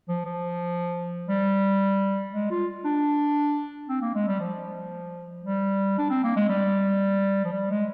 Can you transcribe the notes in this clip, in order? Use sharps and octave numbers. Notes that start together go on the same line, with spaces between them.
F3
F3
G3
G#3
F4
D4
C4
A#3
G#3
G3
F3
G3
D4
C4
A#3
G#3
G3
F3
G3
G#3